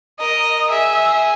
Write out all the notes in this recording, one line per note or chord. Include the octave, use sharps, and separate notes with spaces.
A#4 D#5
G#4 E5